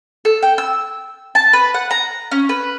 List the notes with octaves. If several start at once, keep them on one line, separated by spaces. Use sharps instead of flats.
A4
G5
E6
A5
B4
F#5
A#5
C#4
B4